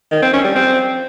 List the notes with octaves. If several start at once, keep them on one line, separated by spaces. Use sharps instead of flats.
D#3
C4
C#4
G3
C4